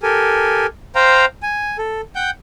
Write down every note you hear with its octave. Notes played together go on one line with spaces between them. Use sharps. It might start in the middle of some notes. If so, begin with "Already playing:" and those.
G4 A4 A#4 G#5
C5 F5 G5 A#5
G#5
A4
F#5 G5 G6